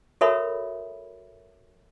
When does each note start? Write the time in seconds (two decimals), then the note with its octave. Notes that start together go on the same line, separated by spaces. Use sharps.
0.21 F#4 A4 A#4 C#5 E5 B5